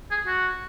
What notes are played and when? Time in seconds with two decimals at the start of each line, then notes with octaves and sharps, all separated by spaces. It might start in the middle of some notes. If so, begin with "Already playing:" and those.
0.11 G#4
0.27 F#4